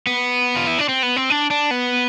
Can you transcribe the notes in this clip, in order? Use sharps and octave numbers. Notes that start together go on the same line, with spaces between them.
B3
F4
E4
D4
C4
B3
C4
D4
D4
B3